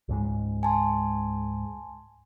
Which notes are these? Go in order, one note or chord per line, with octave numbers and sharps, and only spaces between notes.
C#2 G#2 G#3
G#5 A5 C6